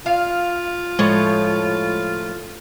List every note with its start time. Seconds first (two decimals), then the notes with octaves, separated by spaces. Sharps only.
0.06 F4 F5
0.99 A2 F3 G#3 C#5